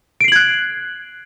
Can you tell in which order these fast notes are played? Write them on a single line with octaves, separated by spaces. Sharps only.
D7 C7 F#7 G#6 F#6